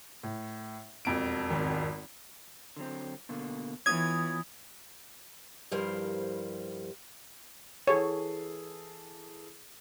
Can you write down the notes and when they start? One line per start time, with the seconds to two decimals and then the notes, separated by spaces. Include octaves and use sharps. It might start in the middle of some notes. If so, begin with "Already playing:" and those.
0.23 A2
1.05 E1 F2 D7
1.50 G#1
2.76 D3 F#3 C4
3.29 B2 D3 A#3
3.86 E3 B3 F4 C#5 D#6 G#6
5.71 G2 F3 G3 E4 A#4 C5
7.87 E3 G#4 A4 C#5